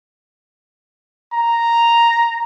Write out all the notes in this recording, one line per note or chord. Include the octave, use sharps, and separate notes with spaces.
A#5